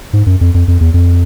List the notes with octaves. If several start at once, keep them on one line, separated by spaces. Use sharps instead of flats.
G#2
F#2
F2
F2
F2
E2
F2